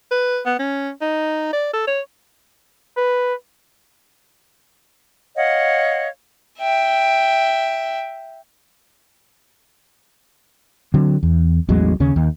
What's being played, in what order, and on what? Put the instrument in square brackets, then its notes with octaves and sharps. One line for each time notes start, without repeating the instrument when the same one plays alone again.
[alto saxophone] B4
B3
C#4
D#4
D5
A4
C#5
[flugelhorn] B4
[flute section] C#5 D#5 F5 F#5
[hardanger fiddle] E5 G5
[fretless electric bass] D3 F#3 C4
E2
A1 E2 F#3 G#3
D#2 C#3 C#4
D#2